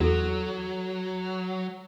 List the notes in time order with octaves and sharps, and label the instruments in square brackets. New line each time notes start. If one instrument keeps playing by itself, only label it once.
[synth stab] E2 [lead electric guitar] F#3 [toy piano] F#4 A4